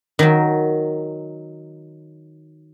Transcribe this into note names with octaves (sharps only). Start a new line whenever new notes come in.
D#3 F#3